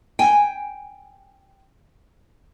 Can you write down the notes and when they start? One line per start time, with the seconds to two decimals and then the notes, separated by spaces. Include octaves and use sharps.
0.19 G5 G#5